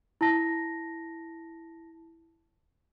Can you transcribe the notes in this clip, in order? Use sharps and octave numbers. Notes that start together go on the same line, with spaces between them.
E4 A5 A#6